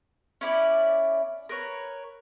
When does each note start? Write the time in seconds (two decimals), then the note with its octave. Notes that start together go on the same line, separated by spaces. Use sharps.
0.41 C#4 E4 D5
1.49 A#4 B4 C#5